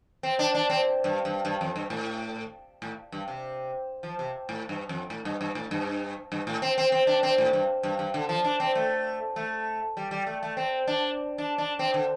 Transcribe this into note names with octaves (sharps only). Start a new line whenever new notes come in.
C4
D4
D4
C4
G2
G2
G2
F2
G2
A2
A2
G2
C3
F3
C3
A2
G2
F2
A2
G2
G2
A2
G2
G2
A2
C4
C4
C4
D4
C4
A2
G2
G2
G2
D3
F3
D4
C4
A3
A3
G3
G3
A3
A3
C4
D4
D4
D4
C4
D3